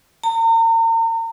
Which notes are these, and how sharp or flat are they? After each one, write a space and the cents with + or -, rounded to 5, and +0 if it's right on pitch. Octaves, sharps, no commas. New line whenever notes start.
A#5 -40